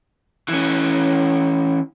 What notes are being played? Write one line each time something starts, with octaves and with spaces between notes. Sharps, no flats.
E3 C#4